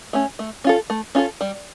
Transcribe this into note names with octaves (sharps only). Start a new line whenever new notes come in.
A3 C#4
A3
C#4 F4 A4
A3
C#4 F4 A4
G3